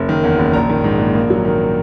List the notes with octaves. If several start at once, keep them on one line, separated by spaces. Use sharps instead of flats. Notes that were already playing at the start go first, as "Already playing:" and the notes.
Already playing: F#1
D#3
E2
F#1
A#1 A#5
D#3
G#2
A#1
A#3
F#3
D#3